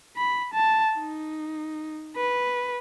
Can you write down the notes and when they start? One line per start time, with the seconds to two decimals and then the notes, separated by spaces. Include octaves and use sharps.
0.17 B5
0.54 A5
0.99 D#4
2.17 B4